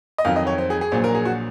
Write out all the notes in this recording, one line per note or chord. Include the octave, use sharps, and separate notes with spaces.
D#5
F2 D#3 F#3 F5
D#5
C#5
C5
G#4
G#4
A#1 A#2 F#3 C5
A#4
G#4
F#4